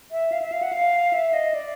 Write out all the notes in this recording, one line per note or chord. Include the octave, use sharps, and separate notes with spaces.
E5
F5
E5
F5
F#5
F5
E5
D#5
D5